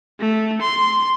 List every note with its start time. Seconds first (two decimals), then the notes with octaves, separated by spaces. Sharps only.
0.20 A3
0.62 C6